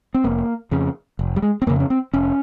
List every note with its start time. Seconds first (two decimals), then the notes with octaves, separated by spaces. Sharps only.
0.14 C4
0.24 F1 A#3
0.71 F2 C#3
1.19 F1
1.36 G3
1.42 G#3
1.62 C4
1.67 F2 C#3 A#3
1.80 C#4
1.90 C4
2.14 F1 C#4